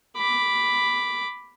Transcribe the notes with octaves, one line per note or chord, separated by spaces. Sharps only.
B5 D6